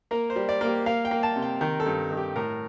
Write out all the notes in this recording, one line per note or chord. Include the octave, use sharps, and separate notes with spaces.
A#3 A#4
C5
G3
D5
A#3
G4
A#3 F5
G5
A#3
A5
C3
G5
D#3 A#4
A4
G2
D#3
G4
A2 A#4